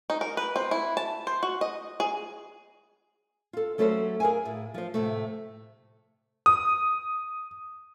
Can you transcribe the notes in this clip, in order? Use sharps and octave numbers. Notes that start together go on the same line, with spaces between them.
D#4
A#4
B4
C4
E4
A5
C5
F#4
D#5
G#4
F4 A4
F#3 A3 C#4 A4 B4 C5
G#4 A#4 F5 G#5
A2
F3 C5
A2 C3 A3
D#6